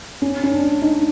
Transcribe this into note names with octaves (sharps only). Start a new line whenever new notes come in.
C#4
C#4
D4
D#4